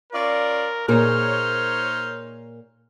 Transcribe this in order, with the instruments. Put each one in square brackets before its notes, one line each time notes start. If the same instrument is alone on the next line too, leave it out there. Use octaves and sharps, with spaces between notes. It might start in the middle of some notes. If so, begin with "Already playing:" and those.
[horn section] C#4 F4 D5 [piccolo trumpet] A#4
[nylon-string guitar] A#2 G#4 A#4 [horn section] D#4 C5 C#5 [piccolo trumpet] F6